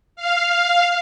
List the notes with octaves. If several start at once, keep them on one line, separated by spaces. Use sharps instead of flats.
F5
F5